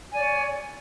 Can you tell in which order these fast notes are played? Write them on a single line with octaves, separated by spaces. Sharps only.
G#5 D5 C#5